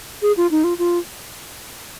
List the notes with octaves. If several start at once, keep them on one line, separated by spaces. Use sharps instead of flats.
G#4
F4
D#4
F4
F4